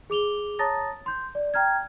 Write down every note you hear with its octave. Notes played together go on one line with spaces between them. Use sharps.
G#4 D6 F7 G7
C#5 A5 A#5 D#6 A6 A#6
C6 G6
D5
G5 A#5 F6 G#6